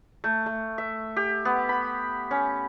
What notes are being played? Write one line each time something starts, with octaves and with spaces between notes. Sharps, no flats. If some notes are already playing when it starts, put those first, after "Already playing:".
A3
A3
E5
G4
B3
B5
C#4